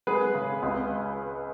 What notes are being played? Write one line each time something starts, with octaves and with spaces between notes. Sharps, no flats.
G#3 G#4 B4
C#3
C#2